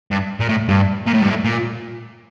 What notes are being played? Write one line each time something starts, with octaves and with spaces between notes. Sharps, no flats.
G2
A#2
A2
G2
A#2
A2
G2
A2
A#2